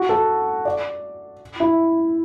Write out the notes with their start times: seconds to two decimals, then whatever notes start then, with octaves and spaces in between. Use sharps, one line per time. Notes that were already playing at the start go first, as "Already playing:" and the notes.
Already playing: F#4
0.09 A4
0.65 D5
1.60 E4